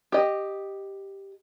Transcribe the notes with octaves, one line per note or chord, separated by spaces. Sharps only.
G4 D#5